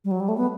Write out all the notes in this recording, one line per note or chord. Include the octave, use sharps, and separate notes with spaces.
G3
F#3
G3
A3
B3